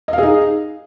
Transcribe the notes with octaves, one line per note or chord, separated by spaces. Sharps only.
D#4 G#4 D#5 F5